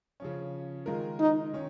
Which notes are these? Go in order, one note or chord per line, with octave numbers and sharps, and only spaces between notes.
C#3 F3 C#4
D#3 G#3 F4 A#4
D#4
D#3 C#4